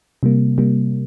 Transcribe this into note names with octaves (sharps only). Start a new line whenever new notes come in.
C3 G3 A#3
C3 G3 A#3